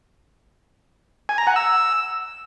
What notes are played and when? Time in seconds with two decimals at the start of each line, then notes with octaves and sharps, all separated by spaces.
1.29 G#5
1.38 A#5
1.47 F#5
1.56 E6